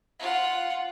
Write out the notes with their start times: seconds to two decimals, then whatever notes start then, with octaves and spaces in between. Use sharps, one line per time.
0.20 F4 F#5